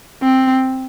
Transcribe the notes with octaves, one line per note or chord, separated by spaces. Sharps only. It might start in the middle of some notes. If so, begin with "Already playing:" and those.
C4